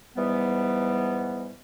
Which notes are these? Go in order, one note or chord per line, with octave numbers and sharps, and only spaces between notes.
G#2 E3 G3 B3